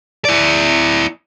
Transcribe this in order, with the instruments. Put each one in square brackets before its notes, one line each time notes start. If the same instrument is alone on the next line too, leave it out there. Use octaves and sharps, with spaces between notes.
[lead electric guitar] E4 D5